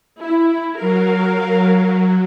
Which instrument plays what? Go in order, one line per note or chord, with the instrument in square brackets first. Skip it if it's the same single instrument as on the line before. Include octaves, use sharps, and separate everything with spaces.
[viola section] E4
[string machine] F#3 [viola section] A#4 F5